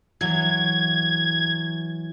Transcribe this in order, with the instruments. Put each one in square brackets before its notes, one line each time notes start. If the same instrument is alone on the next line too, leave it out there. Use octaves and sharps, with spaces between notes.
[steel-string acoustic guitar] E3 F#3 [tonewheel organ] G#6